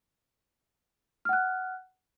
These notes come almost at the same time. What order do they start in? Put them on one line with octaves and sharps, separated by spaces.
F6 F#5 F#6